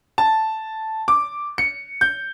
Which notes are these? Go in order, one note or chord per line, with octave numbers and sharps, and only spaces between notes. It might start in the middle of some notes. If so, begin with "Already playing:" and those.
A5
D6
C#7
G6